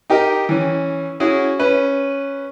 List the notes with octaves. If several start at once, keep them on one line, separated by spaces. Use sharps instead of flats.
D#4 G4 A#4 D#5
E3 C#4
C#4 E4 F#4 G#4
C#4 B4